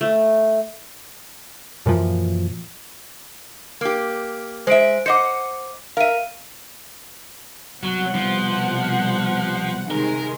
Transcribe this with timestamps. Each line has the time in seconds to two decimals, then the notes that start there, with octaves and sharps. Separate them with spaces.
0.01 A3
1.86 F#2 A#2 E3 F3
3.81 A#3 G4
4.67 G#3 C5 E5 D7
5.06 C5 D#5 F#5 D6 C#7
5.97 A#4 E5 F5 D#7
7.83 C2 B2 F#3 F#5
8.15 F3
9.91 C3 D#3 G#3 A#4